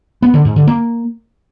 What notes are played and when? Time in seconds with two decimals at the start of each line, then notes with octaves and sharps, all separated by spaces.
0.22 B3
0.34 D3
0.45 G#2
0.56 D3
0.67 A#3